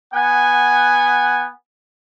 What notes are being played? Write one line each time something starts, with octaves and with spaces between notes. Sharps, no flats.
B3 F#5 G#5